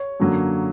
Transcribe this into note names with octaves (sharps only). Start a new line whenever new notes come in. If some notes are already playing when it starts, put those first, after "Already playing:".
Already playing: C#5
F#2 D3 F#3 A#3